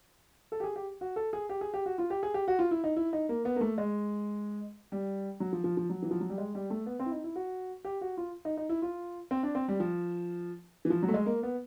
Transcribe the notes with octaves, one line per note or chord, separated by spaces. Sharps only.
A4
G4
G#4
G4
F#4
A4
G#4
G4
G#4
G4
F#4
F4
G4
G#4
G4
F#4
F4
E4
D#4
E4
D#4
A#3
B3
A#3
A3
G#3
G3
F#3
F3
F3
F3
F#3
E3
F3
F#3
G3
G#3
G3
A3
B3
C4
E4
D#4
E4
F#4
G4
F#4
F4
D#4
D#4
E4
F4
C4
D4
C4
G3
F3
E3
F3
F#3
A3
G#3
A#3
B3